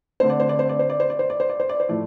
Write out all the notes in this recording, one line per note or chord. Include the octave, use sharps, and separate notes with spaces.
D3 A3 C4 C5
D5
C5
D5
C5
D5
C5
D5
C5
D5
C5
D5
C5
D5
C5
D5
C5
A2 F3 A3 D5